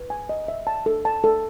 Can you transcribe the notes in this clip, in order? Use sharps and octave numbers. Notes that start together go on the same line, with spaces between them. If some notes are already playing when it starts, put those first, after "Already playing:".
Already playing: B4
G#5
D#5
E5
A5
A4
A5
A4